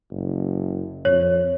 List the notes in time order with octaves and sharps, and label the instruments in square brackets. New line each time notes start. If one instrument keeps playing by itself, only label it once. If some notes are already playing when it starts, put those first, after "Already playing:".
[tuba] F#1
[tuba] F2 [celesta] C#5